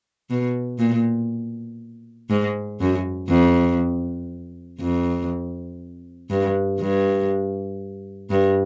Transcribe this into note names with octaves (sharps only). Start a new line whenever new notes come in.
B2
A#2
G#2
F#2
F2
F2
G2
G2
G2